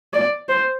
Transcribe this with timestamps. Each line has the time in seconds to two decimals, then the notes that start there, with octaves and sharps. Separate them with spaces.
0.13 D5
0.49 C5